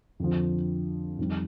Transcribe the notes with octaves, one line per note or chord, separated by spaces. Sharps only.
F2 D3 F3
F2 D#3 G3